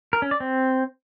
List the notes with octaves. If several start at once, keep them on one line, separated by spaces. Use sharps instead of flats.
A#4
C#4
D5
C4